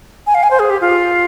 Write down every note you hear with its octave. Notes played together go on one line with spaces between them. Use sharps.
G#5
F5
G#5
C5
G#4
G4
F4